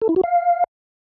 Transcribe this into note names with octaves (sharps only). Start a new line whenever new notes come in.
A4
E4
F#4
F5